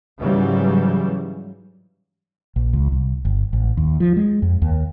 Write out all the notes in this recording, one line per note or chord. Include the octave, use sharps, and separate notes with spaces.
G#2 C#3 E3 F#3 G3
A#1
C#2
C2
G1
A1
D#2
F3
G#3
F2
D#2